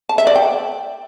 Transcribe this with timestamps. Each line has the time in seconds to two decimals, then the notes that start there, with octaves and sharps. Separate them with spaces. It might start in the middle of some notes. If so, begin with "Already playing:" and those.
0.09 A5
0.18 E5
0.27 D5
0.36 G5